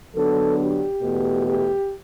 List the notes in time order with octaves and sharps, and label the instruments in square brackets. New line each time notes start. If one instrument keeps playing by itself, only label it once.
[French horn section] D3 F#3 B3 D4 A4
G4
E2 B2 A3
G4